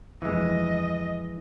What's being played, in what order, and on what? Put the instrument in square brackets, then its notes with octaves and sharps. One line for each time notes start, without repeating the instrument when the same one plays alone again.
[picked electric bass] G1 F2 [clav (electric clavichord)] E3 G#3 [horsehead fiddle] D#5